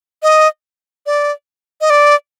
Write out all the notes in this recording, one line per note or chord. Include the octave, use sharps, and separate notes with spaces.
D#5
D5
D#5
D5